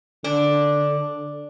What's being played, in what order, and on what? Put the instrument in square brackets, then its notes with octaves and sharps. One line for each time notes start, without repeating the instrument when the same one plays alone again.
[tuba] D3 [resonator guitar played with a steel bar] D4